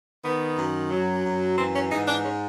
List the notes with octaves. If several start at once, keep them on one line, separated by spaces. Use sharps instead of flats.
D#3 B3
F#2
F#3
F#2
E3 C4
C#4
G#2 D#4
D4
G#3 C#4